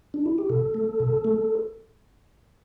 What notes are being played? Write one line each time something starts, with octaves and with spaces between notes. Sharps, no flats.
D4
E4
G4
B2 A4
A3
B2
A3